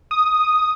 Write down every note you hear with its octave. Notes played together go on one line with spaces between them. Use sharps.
D#6